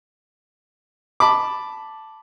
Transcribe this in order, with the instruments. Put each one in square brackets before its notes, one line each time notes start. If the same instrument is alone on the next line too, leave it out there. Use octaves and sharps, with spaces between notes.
[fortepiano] A5 B5 D6